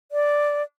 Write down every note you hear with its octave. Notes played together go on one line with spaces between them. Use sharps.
D5